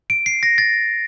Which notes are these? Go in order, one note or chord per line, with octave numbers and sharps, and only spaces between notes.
D7
C7
A#6
A6